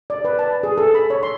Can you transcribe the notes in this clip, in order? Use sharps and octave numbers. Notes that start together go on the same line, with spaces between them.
D5
B4
A5
G#4
A4
B5
C#5
C6